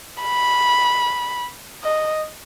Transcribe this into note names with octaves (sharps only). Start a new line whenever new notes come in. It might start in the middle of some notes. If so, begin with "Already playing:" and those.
B5
D#5